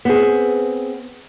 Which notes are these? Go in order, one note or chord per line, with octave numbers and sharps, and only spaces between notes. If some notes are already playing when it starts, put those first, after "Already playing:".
B3 C4 G#4